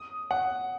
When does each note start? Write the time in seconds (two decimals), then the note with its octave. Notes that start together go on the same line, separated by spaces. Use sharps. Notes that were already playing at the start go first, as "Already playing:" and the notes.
Already playing: D#6
0.31 F#5